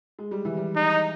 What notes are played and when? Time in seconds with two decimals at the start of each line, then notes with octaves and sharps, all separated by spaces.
0.19 G#3
0.31 G3
0.45 E3
0.57 G3
0.76 D#4